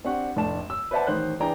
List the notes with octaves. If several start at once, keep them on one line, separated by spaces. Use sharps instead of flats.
C4 D4 G4 F#5 C#6
F1 A2 D4 A5 E7
E6
B4 C5 D5 E5 F#5 A5
A1 D#3 C5 F#6
E3 D4 G#4 G5 A#5